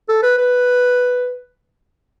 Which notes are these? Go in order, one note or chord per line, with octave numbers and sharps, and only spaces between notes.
A4
B4
B4